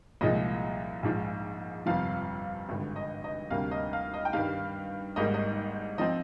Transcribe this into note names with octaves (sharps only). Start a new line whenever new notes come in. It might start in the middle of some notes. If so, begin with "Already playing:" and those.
C2 A#2 F3 G#3 D#5
A#1 G#2 F3
G1 F2 C3 F3 F5
G#1 G2 D3
D#5
D#5
D2 C3 G3 A#3 F5
D#5
F5
D#5
G5
G2 D#3 G3 F5
G#1 G#2 G3 A#3 D#5
D#5
F3 C4 D#5